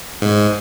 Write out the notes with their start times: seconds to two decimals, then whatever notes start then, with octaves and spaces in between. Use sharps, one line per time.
0.22 G#2